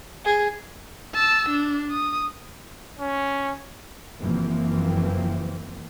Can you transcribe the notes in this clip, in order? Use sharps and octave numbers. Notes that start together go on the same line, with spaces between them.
G#4
A5 E6
D4
D#6
C#4
F#1 F#2 E3 F3 A#3 C4